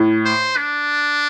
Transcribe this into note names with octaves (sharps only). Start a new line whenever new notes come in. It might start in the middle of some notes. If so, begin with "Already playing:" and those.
Already playing: A2
C5
D4